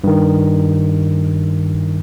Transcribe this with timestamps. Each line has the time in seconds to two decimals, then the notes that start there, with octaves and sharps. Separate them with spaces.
0.04 G2 D#3